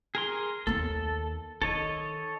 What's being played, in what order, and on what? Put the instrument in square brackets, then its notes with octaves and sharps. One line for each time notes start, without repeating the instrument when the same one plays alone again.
[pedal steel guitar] G#4 A#4 C6
[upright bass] D#2 A#3 [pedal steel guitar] A4
[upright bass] D#3 [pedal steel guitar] A4 C#5 D#5